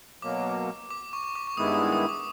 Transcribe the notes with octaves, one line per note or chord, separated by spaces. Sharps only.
B2 F#3 A#3 D6
D6
C#6
C#6
D6
C#6
G2 D#3 G#3 B3 E4 D#6
D#6
D#6
D6